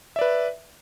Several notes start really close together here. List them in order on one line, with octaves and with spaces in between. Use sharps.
E5 D5 B4